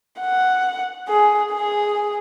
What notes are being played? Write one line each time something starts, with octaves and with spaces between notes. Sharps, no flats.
F#5
G#4
G#4